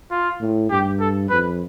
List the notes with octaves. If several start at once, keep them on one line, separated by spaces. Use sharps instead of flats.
F4
A2
G2 G4
A4
F2 B4